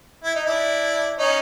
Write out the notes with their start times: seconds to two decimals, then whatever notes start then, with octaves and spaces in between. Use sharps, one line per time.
0.24 E4
0.35 D#4
0.46 D4 E4
1.18 C#4 D#4